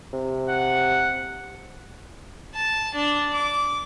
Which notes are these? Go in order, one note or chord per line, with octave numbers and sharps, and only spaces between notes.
C3
F#5
A5
D4
D6